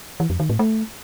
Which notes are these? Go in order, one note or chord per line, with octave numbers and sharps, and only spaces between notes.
E3
F2
D#3
A2
A3